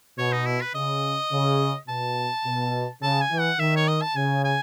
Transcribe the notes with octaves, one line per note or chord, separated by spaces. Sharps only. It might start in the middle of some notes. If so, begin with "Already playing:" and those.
B2 C#5
D#4
E4
B4
C#3 D#5
C#3
B2 A5
B2
C#3 A5
G#5
E3
F#5
D#3 E5
C#5
D#5
A5
C#3 G#5
G#5